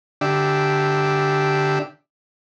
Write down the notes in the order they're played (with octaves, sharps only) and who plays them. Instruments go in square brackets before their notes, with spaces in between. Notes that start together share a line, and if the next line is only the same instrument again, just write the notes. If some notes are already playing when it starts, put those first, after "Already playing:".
[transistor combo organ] D3 D4 G4 E5